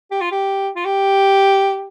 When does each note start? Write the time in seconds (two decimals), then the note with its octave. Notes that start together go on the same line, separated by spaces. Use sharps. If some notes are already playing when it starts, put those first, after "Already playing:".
0.11 G4
0.21 F4
0.31 G4
0.76 F4
0.85 G4